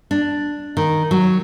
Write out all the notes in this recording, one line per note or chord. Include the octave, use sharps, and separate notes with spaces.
D4
D#3
F#3